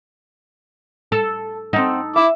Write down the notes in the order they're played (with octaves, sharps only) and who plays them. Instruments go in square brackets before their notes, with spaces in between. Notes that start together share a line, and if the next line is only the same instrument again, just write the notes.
[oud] A4
[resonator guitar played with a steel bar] C4 F#5 [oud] D#4 A4
[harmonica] E4 D6 [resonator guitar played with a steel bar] E5